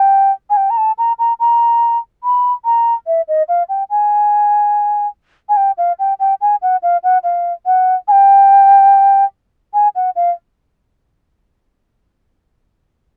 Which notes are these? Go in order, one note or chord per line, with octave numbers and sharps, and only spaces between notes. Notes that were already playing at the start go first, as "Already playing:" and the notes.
Already playing: G5
G#5
G5
A#5
A5
A#5
A#5
A#5
B5
A#5
E5
D#5
F5
G5
G#5
G#5
G5
F5
G5
G5
G#5
F#5
F5
F#5
F5
F#5
G#5
G5
G#5
F#5
F5